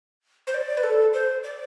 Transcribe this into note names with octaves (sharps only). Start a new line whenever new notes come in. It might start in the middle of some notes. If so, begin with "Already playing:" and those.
C5
D5
B4
A4
C5
D5